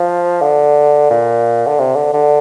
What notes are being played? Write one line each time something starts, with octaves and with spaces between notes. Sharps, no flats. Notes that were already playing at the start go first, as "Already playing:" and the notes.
Already playing: F3
D3
A#2
D3
C3
D3
D3